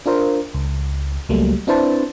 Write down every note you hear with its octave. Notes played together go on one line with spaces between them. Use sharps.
D4 F4 A#4 C5
C#2
C#2 F#3 G3 A3 A#3
C4 D4 E4 B4 C5 A5